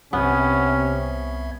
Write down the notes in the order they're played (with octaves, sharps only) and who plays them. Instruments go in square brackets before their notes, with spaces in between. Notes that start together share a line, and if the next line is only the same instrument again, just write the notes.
[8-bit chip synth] C2 E5 G#6 [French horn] C3 [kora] B3 [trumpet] C#4